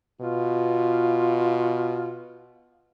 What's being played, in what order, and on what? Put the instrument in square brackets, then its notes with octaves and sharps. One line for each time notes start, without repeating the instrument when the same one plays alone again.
[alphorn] B2 [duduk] F4